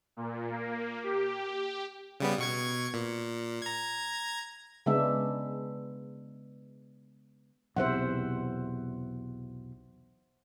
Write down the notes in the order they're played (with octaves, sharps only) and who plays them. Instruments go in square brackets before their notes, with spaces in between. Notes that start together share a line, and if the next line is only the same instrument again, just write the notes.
[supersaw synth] A#2
A#3
G4
[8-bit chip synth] C#3 G3 B3
B2 C#6 G#6
A#2
A#5 G#6
[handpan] C#3 G#3 B3 D4 E5
[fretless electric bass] B1 E2 C3 [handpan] C5 E5 F#5